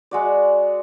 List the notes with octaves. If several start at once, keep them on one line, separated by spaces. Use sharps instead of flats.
G#3 F#4 D5